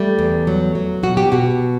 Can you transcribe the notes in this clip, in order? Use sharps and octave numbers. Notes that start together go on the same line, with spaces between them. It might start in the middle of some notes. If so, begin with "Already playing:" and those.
Already playing: G3 A3
E2
F#3
F#3
B2 F#4
G4
B2 F#4